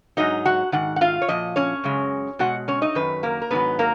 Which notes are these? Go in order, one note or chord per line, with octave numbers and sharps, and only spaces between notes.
G#2 F#3 D#4 D#5
F#4 F#5
G#2 D#3 F#5
F#5
F4 F5
C#5
A#2 F3 D#5
C#4 C#5
F#2 C#3 G#3
B2 G#3 F#4 F#5
C#4 C#5
D#4 D#5
F#2 D#3 B4
A#3 A#4
A#4
G#2 D#3 F#3 B3 B4
A#3 A#4